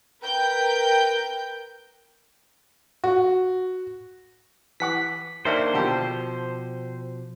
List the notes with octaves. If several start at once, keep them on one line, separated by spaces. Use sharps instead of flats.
A#4 B4 G5 G6
F#4
E3 F#5 D6 B6
D#3 A#3 D4 A#4 C5 E5
B2 D3 F3 G4 A4